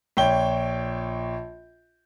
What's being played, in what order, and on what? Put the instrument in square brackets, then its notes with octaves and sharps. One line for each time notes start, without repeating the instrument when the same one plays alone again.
[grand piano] A#1 C#5 G5 G7